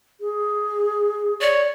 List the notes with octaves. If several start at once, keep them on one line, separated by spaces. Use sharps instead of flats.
G#4
C#5 D5